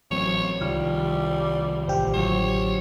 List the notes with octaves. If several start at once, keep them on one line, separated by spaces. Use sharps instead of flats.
A1 F#3 C4 C#5
C2 D#3 F3 G3 F5 F6
A1 G4 C5 F5
D3 F#3 F4 C#5